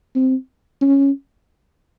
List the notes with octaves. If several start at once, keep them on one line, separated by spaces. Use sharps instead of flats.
C4
C#4